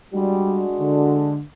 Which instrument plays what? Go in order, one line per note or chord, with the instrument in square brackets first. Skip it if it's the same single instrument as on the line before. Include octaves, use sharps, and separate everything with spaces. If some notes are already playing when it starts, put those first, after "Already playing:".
[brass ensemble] G3 [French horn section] G#3 D4 F#4
[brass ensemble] D3